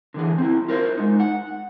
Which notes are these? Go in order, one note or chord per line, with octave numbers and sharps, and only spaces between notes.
D3 E3 G#4
C4 E4
F4 A#4 C5
G#3 D#4
F#5